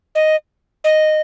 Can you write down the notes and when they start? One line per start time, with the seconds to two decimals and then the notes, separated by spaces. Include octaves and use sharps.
0.15 D#5
0.84 D#5